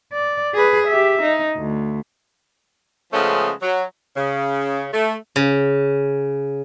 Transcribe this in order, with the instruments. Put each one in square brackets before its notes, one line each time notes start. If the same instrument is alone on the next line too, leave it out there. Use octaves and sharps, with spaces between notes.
[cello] D5
G#4 B4
G4 E5
D#4
D2
[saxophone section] C#3 F3 G#3 A3 B3 C#4
F#3
C#3
A3
[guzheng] C#3